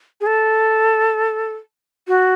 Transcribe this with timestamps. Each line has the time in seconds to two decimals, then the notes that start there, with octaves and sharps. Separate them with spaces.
0.21 G#4
0.26 A4
2.08 F#4